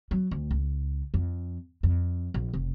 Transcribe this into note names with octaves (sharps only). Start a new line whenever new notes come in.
F#3
D2
C#2
F2
F2
A#1
F1